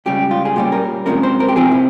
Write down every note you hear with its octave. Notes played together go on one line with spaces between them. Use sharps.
C#2 C#3 G3 G4
F4
G#4
A#2 G3 C#4 G4
A#4
C2 C3 F3 G#3 C#4 A#4
C5
A#4
G4
F2 C3 F3 C4 G#4
E4